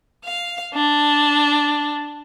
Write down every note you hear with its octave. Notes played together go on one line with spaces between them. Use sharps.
F5
D4